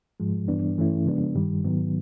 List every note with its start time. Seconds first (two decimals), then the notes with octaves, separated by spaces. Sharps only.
0.20 G#2 F3 G#3
0.48 G2 E3 G3 B3 D4
0.77 G2 E3 A3 C#4 E4
1.06 C#3 F3 G#3 B3 D4
1.36 G2 D#3 G3
1.64 G#2 D#3 F#3 B3